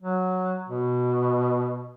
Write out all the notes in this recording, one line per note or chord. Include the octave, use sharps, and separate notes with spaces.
F#3
B2